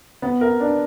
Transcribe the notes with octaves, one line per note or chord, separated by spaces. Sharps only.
B3
A#4
D4